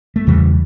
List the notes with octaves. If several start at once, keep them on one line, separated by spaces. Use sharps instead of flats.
A3
E2 C#3 E3 G3